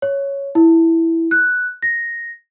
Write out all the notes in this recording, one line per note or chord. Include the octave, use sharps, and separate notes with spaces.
C#5
E4
F#6
A#6